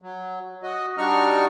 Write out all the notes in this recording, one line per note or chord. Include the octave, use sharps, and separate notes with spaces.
F#3
F#4 D#5
G3 D4 D#4 F#4 C#6 F6